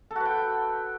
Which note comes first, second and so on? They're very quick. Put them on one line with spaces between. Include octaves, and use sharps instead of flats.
A4 F#4 B4 G5